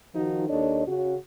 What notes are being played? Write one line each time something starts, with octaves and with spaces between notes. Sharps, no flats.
D#3 F3 D#4 F4 F#4
D#2 D4 A4 C#5 D#5
C#3 C#4 F#4